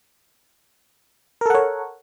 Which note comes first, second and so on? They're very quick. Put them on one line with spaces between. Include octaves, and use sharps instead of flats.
A#4 A4 F#5 C#5